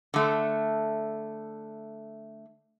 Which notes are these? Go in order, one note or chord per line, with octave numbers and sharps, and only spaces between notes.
D3 A3